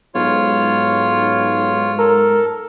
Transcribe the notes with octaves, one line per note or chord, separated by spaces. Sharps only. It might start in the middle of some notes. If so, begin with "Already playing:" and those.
B1 G#2 F4 C#5
A4 A#4